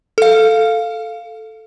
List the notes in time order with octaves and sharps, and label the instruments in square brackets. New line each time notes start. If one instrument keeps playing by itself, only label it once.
[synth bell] A4 F5